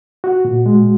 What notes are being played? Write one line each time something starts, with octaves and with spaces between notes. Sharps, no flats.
F#4
A#2
G#3